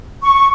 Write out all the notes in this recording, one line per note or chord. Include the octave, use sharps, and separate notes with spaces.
C#6